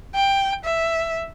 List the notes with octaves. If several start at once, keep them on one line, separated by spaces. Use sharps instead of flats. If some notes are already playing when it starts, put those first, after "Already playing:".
G5
E5